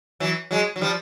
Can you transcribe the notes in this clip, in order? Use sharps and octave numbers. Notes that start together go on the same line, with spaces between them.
E3 F#3
F#3 G#3
F#3
F3 G3